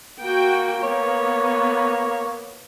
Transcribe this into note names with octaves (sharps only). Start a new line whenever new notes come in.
A#3 F#4 G5
B3 C#5